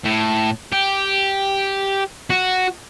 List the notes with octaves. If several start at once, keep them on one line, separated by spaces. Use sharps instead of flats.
A2
G4
F#4